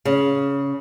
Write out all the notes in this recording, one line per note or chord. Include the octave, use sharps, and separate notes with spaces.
C#3